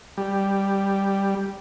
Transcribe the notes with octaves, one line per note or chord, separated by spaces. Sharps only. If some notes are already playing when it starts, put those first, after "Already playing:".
G3